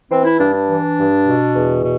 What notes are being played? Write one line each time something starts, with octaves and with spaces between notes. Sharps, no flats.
E3 C4
E4
G2 D4
D4
E3
G2
B2
E2
B2